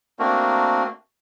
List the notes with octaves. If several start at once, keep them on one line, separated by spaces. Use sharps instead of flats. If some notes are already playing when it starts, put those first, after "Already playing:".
A3 A#3 C4 D4 F#4 A#4